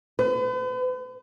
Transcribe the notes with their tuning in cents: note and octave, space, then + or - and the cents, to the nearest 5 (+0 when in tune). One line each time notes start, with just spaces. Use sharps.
B4 +45